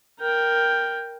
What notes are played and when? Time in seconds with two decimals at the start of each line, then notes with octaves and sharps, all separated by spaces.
0.20 A#4 G5